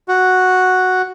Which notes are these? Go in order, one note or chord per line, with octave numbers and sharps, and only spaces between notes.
F#4